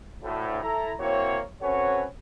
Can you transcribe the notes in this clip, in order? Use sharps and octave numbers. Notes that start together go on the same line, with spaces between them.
D2 A2
E4 A4 A#5
A#3 C4 E4 F#4 C#5
C4 C#4 F#4 A4 B4 C#5